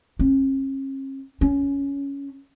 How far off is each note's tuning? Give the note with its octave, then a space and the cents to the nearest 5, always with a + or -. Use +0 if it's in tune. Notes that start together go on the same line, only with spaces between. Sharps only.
C#4 -45
C#4 +10